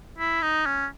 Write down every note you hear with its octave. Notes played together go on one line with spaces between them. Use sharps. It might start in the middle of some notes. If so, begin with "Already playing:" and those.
E4
D#4
C#4